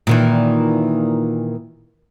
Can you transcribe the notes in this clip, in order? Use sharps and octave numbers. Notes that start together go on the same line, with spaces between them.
A#2 D#3 E3